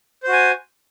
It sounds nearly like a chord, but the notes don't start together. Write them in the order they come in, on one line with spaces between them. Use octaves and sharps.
C5 F#4 G#5